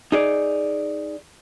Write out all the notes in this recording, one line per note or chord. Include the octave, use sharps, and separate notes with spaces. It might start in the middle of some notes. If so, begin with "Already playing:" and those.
D#4 G#4 D5